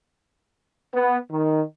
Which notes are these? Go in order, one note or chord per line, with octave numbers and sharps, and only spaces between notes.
B3
D#3